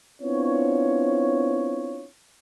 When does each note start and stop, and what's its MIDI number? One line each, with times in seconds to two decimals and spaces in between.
0.22 2.06 59
0.22 2.06 60
0.22 2.06 62
0.22 2.06 64
0.22 2.06 65
0.22 2.06 73